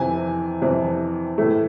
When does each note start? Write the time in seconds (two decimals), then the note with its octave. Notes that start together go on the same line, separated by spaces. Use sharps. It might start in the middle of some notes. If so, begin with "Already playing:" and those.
Already playing: F2 C3 E3 G#5
0.62 F2 C3 E3
1.38 A2 E3 A3